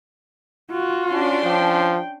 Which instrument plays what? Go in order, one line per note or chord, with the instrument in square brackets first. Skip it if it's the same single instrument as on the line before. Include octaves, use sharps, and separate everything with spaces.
[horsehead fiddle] F4 F#4
[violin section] C#4 D4 C6
[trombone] F3 [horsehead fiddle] G5